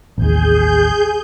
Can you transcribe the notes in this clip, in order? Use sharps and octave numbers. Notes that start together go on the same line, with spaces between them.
A1 D#2 G#4 G6